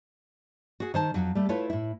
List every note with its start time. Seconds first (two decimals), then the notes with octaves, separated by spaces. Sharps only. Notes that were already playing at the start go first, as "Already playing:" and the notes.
0.80 F#4 G#4
0.94 D#3 C5 A5
1.14 F2 F#3
1.35 G3 A3
1.49 A3 E4 F4 A4 B4 C#5
1.70 A2 E4